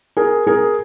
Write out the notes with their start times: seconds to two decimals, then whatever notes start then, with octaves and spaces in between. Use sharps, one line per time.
0.17 G#4 A#4
0.47 G#4 A#4